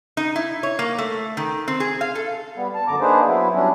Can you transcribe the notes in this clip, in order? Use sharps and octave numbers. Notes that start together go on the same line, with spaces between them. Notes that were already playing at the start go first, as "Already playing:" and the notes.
D#4
E4
C#5
A#3
A3
D#3
C4
G#4
F5
A4
G3 B3
A5
F#2 D3 A#5 D6
A#3 D4 D#4 G#4 B4 C5
F#3 B3 E4
F#3 G3 C#4 D4